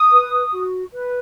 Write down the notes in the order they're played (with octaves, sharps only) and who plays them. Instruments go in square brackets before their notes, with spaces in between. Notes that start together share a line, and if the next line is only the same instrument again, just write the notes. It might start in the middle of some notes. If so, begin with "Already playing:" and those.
Already playing: [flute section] D#6
B4
F#4
B4